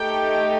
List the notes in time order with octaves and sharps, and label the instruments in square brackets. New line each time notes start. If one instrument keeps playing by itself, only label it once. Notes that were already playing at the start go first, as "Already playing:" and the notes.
Already playing: [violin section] A3 D#4 G4 G5